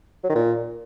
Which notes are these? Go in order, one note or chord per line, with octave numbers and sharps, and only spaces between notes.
F#3
D#3
A#2